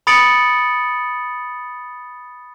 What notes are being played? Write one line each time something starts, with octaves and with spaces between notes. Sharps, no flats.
B5 D#6 A6 C#7 D7 F#7